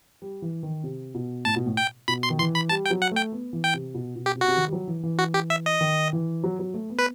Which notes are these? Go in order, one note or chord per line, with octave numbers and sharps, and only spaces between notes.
G3
E3
D#3
C3
B2
A2 A5
B2
A2
G5
B2 B5
C6
D#3
E3 C6
B5
G3 A5
G5
F#3
F#5
A3 G5
B3
E3
G5
C3
B2
B2
G4
C3
F#4
C3
D#3
G3
F#3
E3
E3
F#4
G4
E5
D#5
D#3
E3
F#3
F#3
A3
B3
B4